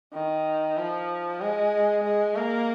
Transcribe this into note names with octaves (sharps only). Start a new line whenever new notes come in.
D#3
F3
G#3
G#3
A#3